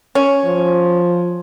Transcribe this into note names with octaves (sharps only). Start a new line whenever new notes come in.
C#4
F3